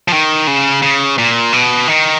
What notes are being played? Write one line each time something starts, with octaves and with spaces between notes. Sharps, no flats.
F3
D#3
C#3
C#3
A#2
B2
D#3